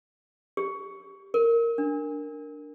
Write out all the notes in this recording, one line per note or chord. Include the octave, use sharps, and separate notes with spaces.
G4
A#4
D4